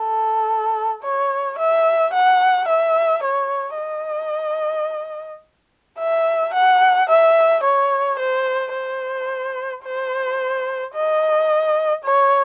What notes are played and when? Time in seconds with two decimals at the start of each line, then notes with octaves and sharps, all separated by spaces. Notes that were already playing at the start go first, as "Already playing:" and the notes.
Already playing: A4
1.03 C#5
1.59 E5
2.13 F#5
2.68 E5
3.23 C#5
3.78 D#5
5.99 E5
6.54 F#5
7.09 E5
7.64 C#5
8.19 C5
8.74 C5
9.84 C5
10.94 D#5
12.04 C#5